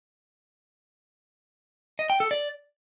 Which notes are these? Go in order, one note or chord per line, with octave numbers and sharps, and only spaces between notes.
D#5
G5
A4
D5